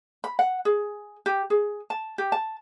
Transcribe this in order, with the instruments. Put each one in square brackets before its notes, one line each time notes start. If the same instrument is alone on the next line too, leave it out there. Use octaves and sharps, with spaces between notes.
[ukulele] B5
F#5
G#4
G4
G#4
A5
G4
A5